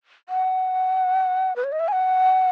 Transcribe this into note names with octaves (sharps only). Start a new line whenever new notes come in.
F#5
B4
C#5
D#5
E5
G#5
F#5